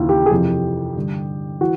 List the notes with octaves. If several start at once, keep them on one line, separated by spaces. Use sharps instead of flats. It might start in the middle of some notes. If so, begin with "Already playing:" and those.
Already playing: D#2 C#3 E3 E4 F4
G4
G#4
F2 C3 E3 G4
G2 D3
E3 F#4